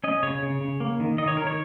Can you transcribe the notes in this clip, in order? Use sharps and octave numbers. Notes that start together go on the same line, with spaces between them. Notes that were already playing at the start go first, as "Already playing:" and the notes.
C#4 D#5
C#3 C#5
C#3
C#3
A#3
D#3
D#3 D#5
C#5
D#3 A#4
C#5